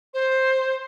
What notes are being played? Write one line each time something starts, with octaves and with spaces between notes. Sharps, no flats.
C5